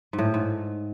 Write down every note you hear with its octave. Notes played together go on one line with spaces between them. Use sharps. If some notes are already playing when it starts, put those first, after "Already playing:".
G#2
A2
G#2